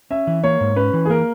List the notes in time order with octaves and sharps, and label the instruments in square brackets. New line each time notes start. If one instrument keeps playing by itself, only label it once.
[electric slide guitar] C#4 [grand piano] E5
[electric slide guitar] E3
[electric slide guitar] A#3 [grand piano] C#5
[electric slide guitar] G#2
[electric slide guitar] C#4 [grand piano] B4
[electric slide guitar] E3
[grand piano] G#4
[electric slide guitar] A#3 [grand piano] A#4